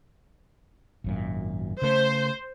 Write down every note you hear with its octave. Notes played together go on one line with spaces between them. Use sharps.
G#1 F#2 A#2
C#3 A3 C5